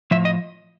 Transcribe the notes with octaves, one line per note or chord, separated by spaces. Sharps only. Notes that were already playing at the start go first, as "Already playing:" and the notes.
A2 F3 E5
D#5